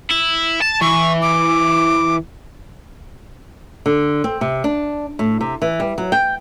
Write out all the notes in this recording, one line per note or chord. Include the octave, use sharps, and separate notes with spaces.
E4
A5
E3 C#6
D6
D3
C4
C3
D4
A2
C3
E3
G3
F#3
G5